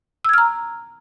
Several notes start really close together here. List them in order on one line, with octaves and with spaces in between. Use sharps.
E6 G#6 F6 A#5